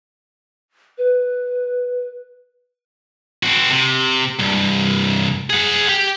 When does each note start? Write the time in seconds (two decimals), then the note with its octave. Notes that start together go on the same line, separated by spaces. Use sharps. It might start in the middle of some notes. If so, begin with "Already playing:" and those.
0.98 B4
3.43 C4 F#4
3.70 C3
4.39 C2 G2
5.50 G#4 F#5
5.89 G4